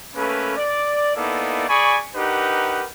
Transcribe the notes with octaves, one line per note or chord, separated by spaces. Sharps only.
A3 A#3 C#4 A4 B4
D5
A#3 B3 D#4 E4 A4 D5
G#4 D5 G#5 B5 C#6
D4 D#4 G4 A#4 B4 F#5